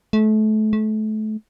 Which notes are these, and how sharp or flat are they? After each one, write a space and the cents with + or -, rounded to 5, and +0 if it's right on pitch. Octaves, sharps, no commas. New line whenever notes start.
A3 -30
A3 -30